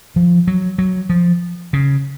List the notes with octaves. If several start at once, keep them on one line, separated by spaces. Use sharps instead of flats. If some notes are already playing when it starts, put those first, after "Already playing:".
F3
F#3
F#3
F3
C#3